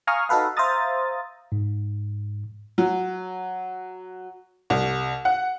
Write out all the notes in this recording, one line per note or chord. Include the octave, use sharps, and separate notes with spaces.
F5 G#5 A#5 C#6 D#6 F6
D#4 F#4 A4 B4 F5
C5 E5 F5 A#5 D#6 A6
G#2
F#3
C2
F#5